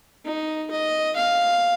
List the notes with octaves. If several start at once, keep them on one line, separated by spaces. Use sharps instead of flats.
D#4
D#5
F5